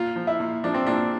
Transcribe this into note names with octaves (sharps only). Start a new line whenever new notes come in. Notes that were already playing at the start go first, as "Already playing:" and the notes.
Already playing: A#2 F4
F3
E4
A#2
F3 D4
C4
A#2 D4